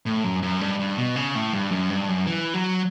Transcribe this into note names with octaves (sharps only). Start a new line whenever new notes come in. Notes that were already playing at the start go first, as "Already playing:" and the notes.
A2
F#2
F#2
G2
G2
B2
C#3
A2
G2
F#2
G2
F#2
E3
F#3